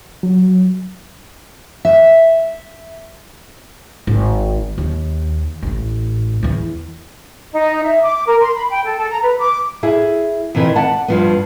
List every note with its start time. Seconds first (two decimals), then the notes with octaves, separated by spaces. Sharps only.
0.23 F#3
1.85 E5
4.07 G#1
4.78 D#2
5.63 A1 A2
6.43 E2 E3
7.53 D#4
7.83 E5
8.03 D6
8.27 A#4
8.40 C6
8.55 B5
8.70 G5
8.85 A4
8.97 A4
9.10 A#5
9.23 B4
9.39 D6
9.83 E4 G#4
10.55 F2 C3 D#3 E3
10.75 D5 F#5 A5
11.08 G2 F3 B3